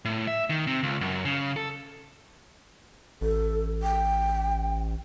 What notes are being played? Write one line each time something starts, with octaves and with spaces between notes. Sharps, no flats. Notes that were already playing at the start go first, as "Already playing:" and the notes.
A2
E5
D#3
C3
C#2
F#2
C#3
A4
A1 A4
G5